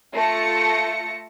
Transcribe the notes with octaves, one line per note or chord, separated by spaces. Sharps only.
A3 F4 A4 A5 A#6 C#7